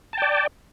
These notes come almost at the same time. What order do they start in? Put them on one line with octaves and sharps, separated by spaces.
A5 G5 D5